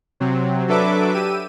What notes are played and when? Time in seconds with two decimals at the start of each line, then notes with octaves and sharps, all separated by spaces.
0.20 C3 F#3 C4
0.68 F#3 D4 A4 B4 E5 D6
1.14 G4 E6 D#7